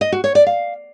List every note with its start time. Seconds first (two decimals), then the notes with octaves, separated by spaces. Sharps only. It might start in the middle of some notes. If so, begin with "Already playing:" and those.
0.01 D#5
0.12 F#4
0.24 C#5
0.35 D5
0.46 F5